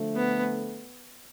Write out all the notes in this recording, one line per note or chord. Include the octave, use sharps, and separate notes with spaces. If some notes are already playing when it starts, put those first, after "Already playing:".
Already playing: D3 F3 A3
B3